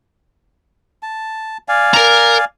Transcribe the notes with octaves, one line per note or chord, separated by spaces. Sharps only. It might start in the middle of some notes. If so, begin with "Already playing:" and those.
A5
D5 F5 G#5
A#4 A#5